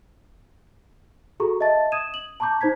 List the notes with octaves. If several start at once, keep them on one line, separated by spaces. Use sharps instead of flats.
F#4 G#4 A4 A#5 C#6
D#5 E5 A5 A6
D#6 G#6 D#7 E7
F#7
A5 A#5 C#6 D6 G6
D#4 C5 A#5 G#6 B6